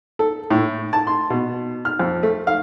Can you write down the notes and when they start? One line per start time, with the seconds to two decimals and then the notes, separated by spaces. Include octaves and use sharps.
0.19 A4
0.51 A2
0.93 A5
1.07 C6
1.30 B2
1.85 F6
1.99 F2
2.23 A3
2.47 F5